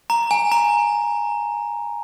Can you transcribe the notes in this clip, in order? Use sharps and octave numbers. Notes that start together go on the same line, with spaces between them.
A#5
G#5
A#5